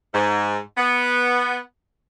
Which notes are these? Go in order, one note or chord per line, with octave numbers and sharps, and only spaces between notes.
G#2
B3